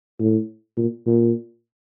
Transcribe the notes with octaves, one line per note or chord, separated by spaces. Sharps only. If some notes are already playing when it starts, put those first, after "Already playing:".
A2
A#2
A#2